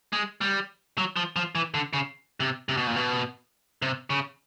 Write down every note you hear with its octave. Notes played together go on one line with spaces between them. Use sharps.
G#3
G3
F#3
F3
F3
E3
D3
C#3
C3
C3
B2
A#2
B2
C3
C#3